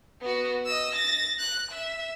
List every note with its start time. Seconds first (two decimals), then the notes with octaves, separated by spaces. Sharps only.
0.21 B3 F#4
0.66 D#5 E6
0.95 A6 A#6
1.39 F#6
1.71 E5